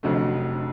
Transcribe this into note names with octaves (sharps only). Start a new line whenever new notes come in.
F1 F2 D3 F#3 A3